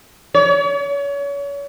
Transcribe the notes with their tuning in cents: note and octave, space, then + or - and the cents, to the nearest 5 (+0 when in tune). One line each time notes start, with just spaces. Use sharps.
C#5 +35